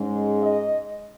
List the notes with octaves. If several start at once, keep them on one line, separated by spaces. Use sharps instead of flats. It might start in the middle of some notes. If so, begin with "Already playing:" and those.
Already playing: G#2 G#3 C#4
D#5